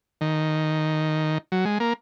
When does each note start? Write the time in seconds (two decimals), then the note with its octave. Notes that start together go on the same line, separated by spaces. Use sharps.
0.21 D#3
1.52 F#3
1.65 G#3
1.80 A#3